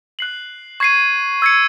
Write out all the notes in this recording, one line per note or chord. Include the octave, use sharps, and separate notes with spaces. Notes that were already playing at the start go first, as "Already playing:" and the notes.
F#6 C7 F#7
C#6 G#6 C7 D#7
E6 G#6 C#7